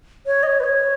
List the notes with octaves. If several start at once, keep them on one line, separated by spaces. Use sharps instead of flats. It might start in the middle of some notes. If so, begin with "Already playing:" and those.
C#5
D#5
C#5
B4
C#5